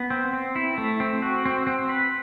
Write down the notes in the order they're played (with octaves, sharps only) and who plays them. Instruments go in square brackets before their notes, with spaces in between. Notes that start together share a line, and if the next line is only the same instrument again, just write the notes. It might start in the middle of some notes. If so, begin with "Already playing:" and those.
Already playing: [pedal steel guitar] B3
C4
C4
E4
A3
C4
F#4
C4
C4
B4